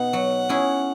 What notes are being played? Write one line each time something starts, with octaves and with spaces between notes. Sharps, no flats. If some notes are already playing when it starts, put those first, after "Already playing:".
Already playing: B2 B3 D#4 F#5
F#3
C#4 E4 G#4